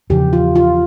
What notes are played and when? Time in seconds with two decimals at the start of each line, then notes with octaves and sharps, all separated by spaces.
0.10 E2 C#3 F3 G4
0.33 F4
0.56 F4